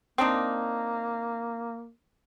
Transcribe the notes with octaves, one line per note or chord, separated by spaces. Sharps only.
A#3 C4 D4 D#4